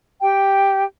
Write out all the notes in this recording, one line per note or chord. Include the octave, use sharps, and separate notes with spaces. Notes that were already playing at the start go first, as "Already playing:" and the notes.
G4 G5